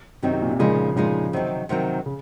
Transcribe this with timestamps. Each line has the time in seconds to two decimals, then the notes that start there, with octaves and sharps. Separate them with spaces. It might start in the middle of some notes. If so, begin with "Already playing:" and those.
0.22 F#2 C3 D#3 F#3 C4 D#4
0.33 C3
0.41 A#2
0.50 C3
0.59 A#2 C#3 F3 G#3 D#4 G#4
0.96 A#2 C#3 F3 G#3 D#4 G#4
1.33 C3 D#3 F#3 C4
1.69 C3 D#3 F#3 C4
2.06 C#3